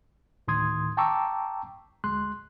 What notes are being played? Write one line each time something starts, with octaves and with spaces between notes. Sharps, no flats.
D2 A2 D#3 C6 D#6 G#6
G5 A5 A#5 C#6 D6 E6
D2 G#3 C6 F#6